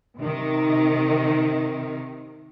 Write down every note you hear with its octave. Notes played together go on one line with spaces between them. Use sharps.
C3 D#3